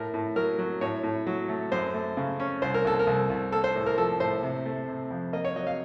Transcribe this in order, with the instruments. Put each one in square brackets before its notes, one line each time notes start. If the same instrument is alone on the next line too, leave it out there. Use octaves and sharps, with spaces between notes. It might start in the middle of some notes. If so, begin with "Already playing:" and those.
Already playing: [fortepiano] A2 A#4
A2
F#3 A#4
F#3
A2 C#5
A2
F#3
A3
F#2 C5
A3
C#3
C#4
C2 C5
A#4
C2 A4
A#4
C2
C2
A#3 A4
C5
A2
A#4
F3 A4
A2 C5
C3
A3
C3
F2
A#3 D#5
C#5
F#3 D#5
F5